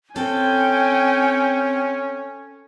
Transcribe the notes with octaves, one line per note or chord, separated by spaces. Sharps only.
C4 C#4 A4 G5 G#5